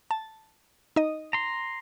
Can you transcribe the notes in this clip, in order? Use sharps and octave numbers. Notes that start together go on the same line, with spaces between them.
A5
D#4 D#5
A#5 C6